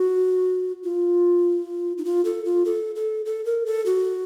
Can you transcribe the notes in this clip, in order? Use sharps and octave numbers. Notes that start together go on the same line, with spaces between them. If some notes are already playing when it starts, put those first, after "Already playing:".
Already playing: F#4
F4
D#4
F4
A4
F4
A4
A4
A4
A#4
A4
F#4